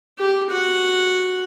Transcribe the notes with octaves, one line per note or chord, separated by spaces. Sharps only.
G4
F#4 F#5